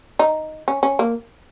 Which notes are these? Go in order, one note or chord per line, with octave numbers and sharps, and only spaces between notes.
D#4
C#4
C#4
A#3